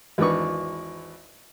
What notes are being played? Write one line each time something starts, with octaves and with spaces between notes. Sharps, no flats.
G#1 E2 D4 B4 C#6